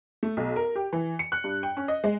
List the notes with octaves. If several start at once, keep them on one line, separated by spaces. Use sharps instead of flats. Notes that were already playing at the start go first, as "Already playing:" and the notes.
A3
B1
A#4
G4
E3
C#7
F#6
G2
G5
C#4
D#5
G#3